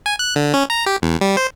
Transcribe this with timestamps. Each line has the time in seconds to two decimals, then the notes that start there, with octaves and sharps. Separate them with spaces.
0.06 G#5
0.19 F#6
0.36 D3
0.54 C#4
0.70 A#5
0.86 G4
1.02 E2
1.21 G3
1.37 C5